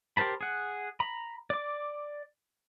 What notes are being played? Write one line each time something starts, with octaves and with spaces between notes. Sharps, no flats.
G4 A#4 C5 A5 B5
G#4 F#5
A#5 B5
D5 D6